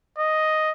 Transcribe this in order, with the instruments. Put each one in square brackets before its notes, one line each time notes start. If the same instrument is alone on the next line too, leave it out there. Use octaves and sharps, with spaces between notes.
[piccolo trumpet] D#5